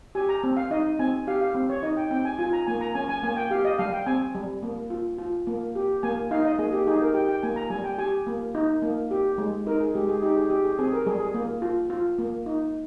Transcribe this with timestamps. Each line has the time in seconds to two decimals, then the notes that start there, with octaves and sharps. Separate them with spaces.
0.15 G4 G#5
0.29 A#5
0.44 C4
0.57 F5
0.71 D#4 D#5
0.99 C4 G#5
1.27 G4 F5
1.41 F5
1.55 C4
1.69 C#5
1.83 D#4 D#5
1.97 G5
2.11 C4 G5
2.25 G#5
2.39 F4 G#5
2.53 A#5
2.67 A#3 G#5
2.81 A#5
2.95 C#4 G#5
3.09 G#5
3.23 A#3 G#5
3.36 G5
3.51 G4 F5
3.65 D#5
3.78 G3 F5
3.92 G5
4.06 C4 G#5
4.35 G3
4.63 A#3
4.90 F4
5.18 F4
5.47 A#3
5.75 G4
6.03 A#3 G#5
6.31 D#4 F5
6.45 D#5
6.58 A#3 G#4
6.72 G4
6.87 D#4 G#4
7.01 A#4
7.14 G4 G5
7.29 G5
7.43 A#3 G#5
7.56 A#5
7.70 G3 G#5
7.84 G5
7.98 G4 G#5
8.27 A#3
8.55 D#4
8.82 A#3
9.11 G4
9.38 G#3
9.67 D#4 A#4
9.80 G#4
9.95 G#3 G4
10.09 G#4
10.23 D#4 G4
10.37 G#4
10.50 G4
10.64 G#4
10.79 C4 G#4
10.93 A#4
11.06 G3 G#4
11.20 G#4
11.34 A#3
11.62 F4
11.90 F4
12.18 A#3
12.46 D#4